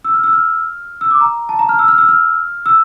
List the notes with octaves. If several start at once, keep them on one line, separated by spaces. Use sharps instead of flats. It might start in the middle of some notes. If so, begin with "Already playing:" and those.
E6
F6
E6
F6
E6
D6
A#5
A5
A#5
F6
E6
F6
E6
F6
E6